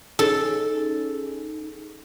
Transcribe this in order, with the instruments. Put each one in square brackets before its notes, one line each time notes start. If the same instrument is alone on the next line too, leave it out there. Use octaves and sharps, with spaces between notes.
[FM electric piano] C#4 D#4 G#4 [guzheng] A4